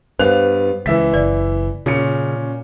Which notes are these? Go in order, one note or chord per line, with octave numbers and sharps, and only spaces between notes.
G2 B3 C5 F5
C#2 E3 E5 B6
F#1 D5
A#2 C#3 C#4 C#7